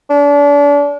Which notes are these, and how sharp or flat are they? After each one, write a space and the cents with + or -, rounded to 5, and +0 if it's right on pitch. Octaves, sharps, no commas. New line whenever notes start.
D4 -35